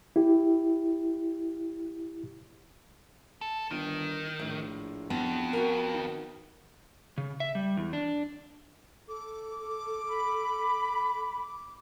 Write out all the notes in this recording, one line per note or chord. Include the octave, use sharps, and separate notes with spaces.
E4 G4
A4
G1 D#3
A#1 A2
F2 B3
F#4 A#4
D#3
C#3
E5
G3
E2
D4
A4 D6
B5